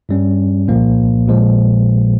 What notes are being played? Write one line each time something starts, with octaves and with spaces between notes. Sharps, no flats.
G2 G3 C#4
C2 A#2 F3 A#3
A#1 A#2 F3 G#3